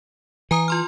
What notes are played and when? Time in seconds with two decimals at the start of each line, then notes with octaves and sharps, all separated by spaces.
0.51 E3 G#5 A#5 D#6
0.68 F4 C6 F6